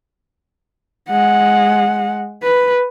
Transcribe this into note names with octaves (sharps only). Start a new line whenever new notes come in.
G#3 F#5
B4